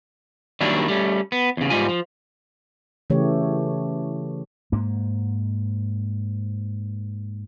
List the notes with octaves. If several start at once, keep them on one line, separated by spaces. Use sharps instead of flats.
D#3 F#3 G3 A#3 D4 E4
G3 A3 C#4
B3
E2 C#3
G#2 G3 F4 G#5
F3
C#3 E3 A3 G4 C#5
G#2 A#3